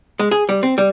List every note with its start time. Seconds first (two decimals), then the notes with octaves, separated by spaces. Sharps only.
0.19 G#3
0.31 G#4
0.49 G3
0.63 C4
0.78 G3